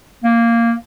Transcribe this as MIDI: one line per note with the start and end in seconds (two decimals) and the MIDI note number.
0.24 0.74 58